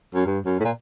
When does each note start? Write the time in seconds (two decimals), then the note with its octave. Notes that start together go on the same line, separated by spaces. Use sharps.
0.14 F#2
0.26 G2
0.45 F#2
0.60 A2
0.64 A#2